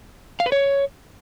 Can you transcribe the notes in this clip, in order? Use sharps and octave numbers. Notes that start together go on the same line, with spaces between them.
F5
B4
C#5